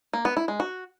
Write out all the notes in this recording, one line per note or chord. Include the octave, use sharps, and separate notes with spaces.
A#3
B3
E4
G#3
F#4